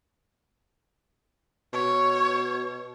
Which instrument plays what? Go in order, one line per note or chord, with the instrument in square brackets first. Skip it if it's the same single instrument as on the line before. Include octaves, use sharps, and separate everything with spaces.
[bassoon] B2 [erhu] C#5